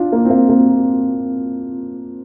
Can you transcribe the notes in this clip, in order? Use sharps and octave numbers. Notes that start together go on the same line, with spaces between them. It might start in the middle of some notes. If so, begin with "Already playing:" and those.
Already playing: D4 F4
A#3
C4
A#3
A#3